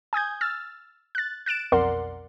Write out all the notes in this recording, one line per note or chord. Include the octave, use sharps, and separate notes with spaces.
G#5 D#6 G6 G#6
E6 F6 A6
F#6 A6
F#6 A6 D7 E7
B1 F2 A#4 D5 F#5 C6